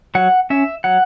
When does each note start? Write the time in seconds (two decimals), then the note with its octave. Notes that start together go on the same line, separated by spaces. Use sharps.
0.15 F#3 F#5
0.50 C#4 E5
0.84 F#3 F#5